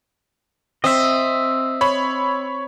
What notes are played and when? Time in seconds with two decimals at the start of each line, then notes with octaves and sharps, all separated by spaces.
0.84 C4 D#5 E5
1.81 C#5 B5